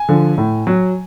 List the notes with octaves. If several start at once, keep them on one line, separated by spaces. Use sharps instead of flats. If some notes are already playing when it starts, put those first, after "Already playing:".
Already playing: G#5
D3 F3
A2
F#3